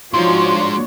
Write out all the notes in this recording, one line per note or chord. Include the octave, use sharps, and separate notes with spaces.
G#2 F3 D4 F#4 C#5 C6